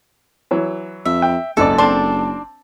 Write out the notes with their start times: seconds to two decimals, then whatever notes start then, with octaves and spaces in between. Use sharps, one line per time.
0.51 E3 F#3
1.05 F2 E5
1.22 G5
1.57 F#1 C#2 G#2 A4 D5
1.78 C4 D4 A5 C6